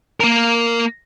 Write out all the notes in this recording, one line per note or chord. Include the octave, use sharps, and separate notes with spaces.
A#3 A#4